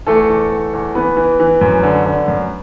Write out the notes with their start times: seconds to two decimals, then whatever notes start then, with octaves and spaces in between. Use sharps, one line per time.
0.07 E2 A3 A4
0.29 E2
0.51 E2
0.73 E2
0.95 E3 B3 B4
1.17 E3
1.40 E3
1.61 F#2
1.83 D3
2.05 D3
2.28 F#2